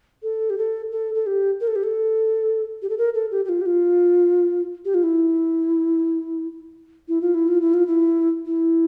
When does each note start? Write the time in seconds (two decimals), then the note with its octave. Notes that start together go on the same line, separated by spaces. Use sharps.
0.23 A4
0.50 G4
0.58 A4
0.92 A4
1.14 A4
1.26 G4
1.61 A#4
1.68 A4
1.76 G4
1.83 A4
2.82 G4
2.89 A4
2.98 A#4
3.14 A4
3.31 G4
3.45 G4
3.49 F4
3.61 G4
3.66 F4
4.85 G4
4.94 F4
5.03 E4
7.08 E4
7.21 F4
7.34 E4
7.48 F4
7.61 E4
7.74 F4
7.87 E4
8.46 E4